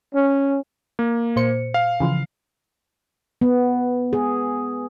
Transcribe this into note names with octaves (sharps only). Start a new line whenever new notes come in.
C#4
A#3
A#2 C5 C#7
F5
C#3 E3 F3
B3
G#4